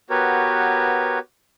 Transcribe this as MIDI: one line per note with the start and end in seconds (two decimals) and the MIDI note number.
0.10 1.19 59
0.10 1.19 66
0.10 1.19 67
0.10 1.19 70
0.10 1.19 71
0.10 1.19 73